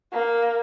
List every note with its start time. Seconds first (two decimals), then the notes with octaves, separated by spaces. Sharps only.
0.13 A#3